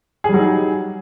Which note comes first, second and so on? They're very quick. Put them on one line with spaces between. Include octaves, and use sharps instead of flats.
G#4 G3 F#3 D#4